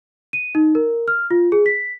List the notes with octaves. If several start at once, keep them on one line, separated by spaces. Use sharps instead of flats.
D#7
D#4
A#4
F6
F4
G#4
B6